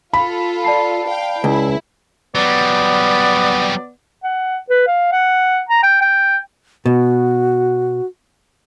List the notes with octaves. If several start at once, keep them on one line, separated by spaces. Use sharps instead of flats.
F4 A4 B5
D5 A5 C7
F5 G5
C#2 E4
F#3 G3 B3 D5
F#5
B4
F5
F#5
A#5
G5
G5
B2 F#4